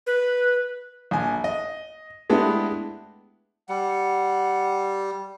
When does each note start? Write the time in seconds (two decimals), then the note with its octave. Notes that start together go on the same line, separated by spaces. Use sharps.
0.07 B4
1.11 A#1 G#5
1.44 D#5
2.30 G#3 A3 B3 D4 E4 G4
3.69 G3 F#5